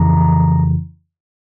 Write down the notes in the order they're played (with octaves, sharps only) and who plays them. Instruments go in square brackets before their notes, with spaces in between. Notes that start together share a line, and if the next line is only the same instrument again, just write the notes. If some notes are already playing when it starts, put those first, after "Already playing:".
Already playing: [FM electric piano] F2 C#3 E3 A#5